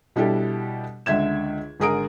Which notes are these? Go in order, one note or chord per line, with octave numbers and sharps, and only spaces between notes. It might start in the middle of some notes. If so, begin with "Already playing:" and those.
B2 G3 D4 E4 G4 A4
C#2 D3 E5 G#6 E7
G#1 D3 G#4 A#4 D#6 D7